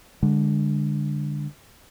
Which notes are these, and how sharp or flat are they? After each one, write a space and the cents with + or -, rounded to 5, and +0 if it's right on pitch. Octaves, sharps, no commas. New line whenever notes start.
D3 +0 G#3 -25